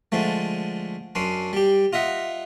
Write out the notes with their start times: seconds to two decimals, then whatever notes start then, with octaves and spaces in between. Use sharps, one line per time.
0.12 D3 F3 G#3 A3
1.15 F#2 C#4 D4 C6
1.53 G3 G4
1.93 F4 D#5 E5 F#5